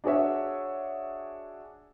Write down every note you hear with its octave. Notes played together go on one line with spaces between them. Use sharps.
D4 F#4 G#4 C#5 E5